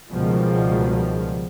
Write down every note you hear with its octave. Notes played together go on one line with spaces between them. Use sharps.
C#2 B2 D#3 F3 G3